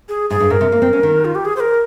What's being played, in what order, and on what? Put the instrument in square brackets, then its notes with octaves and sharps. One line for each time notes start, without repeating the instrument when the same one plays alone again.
[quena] G#4
[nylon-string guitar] G#2 [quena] G#4
[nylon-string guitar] G2
[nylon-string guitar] G#2 [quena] A#4
[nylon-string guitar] C3
A#3
C4
C#4
D#3
[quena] F4
G4
G#4
C5
A#4